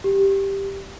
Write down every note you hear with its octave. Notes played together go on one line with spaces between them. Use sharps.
G4